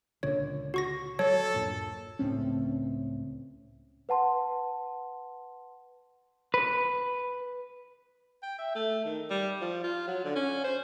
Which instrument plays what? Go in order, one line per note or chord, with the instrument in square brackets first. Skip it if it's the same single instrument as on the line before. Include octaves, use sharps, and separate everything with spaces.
[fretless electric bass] C#2 A#2 D3 [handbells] C#5
[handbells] F#4 C#6 A#6
[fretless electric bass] F#3 [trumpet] A4 [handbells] C#5
[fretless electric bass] D#1 G2 A#2
C#2 A2 C4 C#4
[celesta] B4 F#5 A5 C6
[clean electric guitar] B4
[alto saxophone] G5
E5
A3
D#3
G3
F3
F4
F#3
D3
C#4
C5